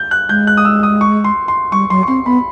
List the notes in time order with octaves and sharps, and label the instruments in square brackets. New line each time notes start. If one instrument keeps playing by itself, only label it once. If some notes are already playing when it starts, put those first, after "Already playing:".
Already playing: [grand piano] G6
F#6
[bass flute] G#3 [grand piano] G6
[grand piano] F#6
D#6
E6
D#6
C#6
C6
C6
[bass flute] G3 [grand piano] C#6
[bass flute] F#3 [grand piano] C6
[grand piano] C#6
[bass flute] C4 [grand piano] C6
[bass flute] B3 [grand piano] B5